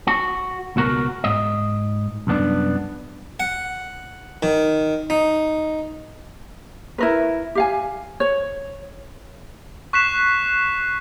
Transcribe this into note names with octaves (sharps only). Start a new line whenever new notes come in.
F#4
C#2 B2 F#4 A#4
G#2 D#5
C2 F#2 B3 D4
F#5
D#3
D#4
E4 A#4 B4
G4 F5 G#5
C#5
C#6 F#6 B6 C7 E7